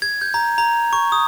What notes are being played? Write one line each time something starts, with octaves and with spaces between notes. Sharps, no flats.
G#6
G6
A#5
A#5
C#6
D#6